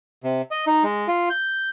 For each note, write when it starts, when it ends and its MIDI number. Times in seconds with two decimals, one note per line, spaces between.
0.24 0.42 48
0.51 0.65 75
0.67 0.83 63
0.84 1.08 56
1.08 1.29 65
1.30 1.70 91